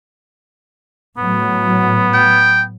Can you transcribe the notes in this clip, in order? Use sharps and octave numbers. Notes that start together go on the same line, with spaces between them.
A2 F#3 B3
G5